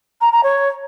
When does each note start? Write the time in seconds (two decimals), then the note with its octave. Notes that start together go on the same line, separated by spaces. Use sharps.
0.21 A#5
0.32 A#5
0.43 C#5